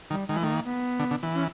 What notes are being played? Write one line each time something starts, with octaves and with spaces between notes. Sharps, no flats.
D#3 G3
D#3 G#3
E3
D#3 A3
A#3
B3
D3
D3
E3
C#4